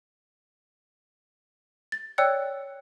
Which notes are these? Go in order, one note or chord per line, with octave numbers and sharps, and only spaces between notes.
A6
C#5 D5 G5 E6 F#6 C#7